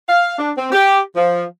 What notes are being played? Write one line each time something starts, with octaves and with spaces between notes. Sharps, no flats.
F5
D4
C4
G4
F3